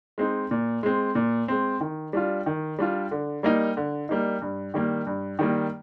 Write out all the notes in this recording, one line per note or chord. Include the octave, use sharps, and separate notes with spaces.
G#3 C4 D#4
A#2
G#3 C4
A#2
G#3 C4
D#3
G3 D4 F4
D#3
G3 D4 F4
D3
G3 A#3 D#4
D3
G3 A#3 D#4
G2
D#3 G3 A#3
G2
D#3 G3 A#3